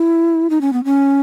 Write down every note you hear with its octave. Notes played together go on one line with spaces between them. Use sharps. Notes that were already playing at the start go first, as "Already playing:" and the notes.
Already playing: E4
D#4
C#4
B3
C#4